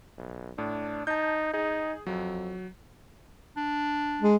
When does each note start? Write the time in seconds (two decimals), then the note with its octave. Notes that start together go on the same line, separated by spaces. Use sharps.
0.18 B1
0.58 A2 D4
1.07 D#4 A5 G6
1.53 D#4 G#4
2.07 F2 F#3
3.57 D4
4.22 G#3